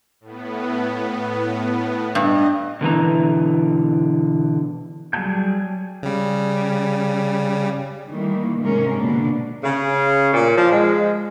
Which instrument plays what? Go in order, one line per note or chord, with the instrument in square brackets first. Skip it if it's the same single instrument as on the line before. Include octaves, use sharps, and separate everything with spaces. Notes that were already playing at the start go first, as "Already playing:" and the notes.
[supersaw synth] A2 B3
[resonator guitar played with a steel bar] G2 [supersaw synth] D#5
[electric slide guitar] B2 D3 E3 A#5
[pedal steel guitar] F#3 G3 G#4 A5 G6
[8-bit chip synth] C#3 G3
[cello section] D#3 E3 G3 A3 A#3
G#2 C3 G#3 C#4 A#4
B2 D3 A#3 D4
[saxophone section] C#3
A#2
F3
G#3